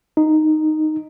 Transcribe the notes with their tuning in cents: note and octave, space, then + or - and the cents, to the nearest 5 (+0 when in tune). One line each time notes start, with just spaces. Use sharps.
D#4 -5